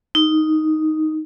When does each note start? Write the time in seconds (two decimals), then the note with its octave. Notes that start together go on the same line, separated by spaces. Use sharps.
0.15 D#4